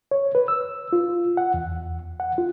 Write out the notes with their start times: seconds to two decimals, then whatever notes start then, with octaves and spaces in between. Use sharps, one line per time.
0.11 C#5
0.35 B4
0.48 E6
0.93 F4
1.37 F#5
1.54 E2
2.20 F#5
2.38 F4